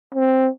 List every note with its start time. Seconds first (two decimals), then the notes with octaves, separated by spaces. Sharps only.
0.15 C4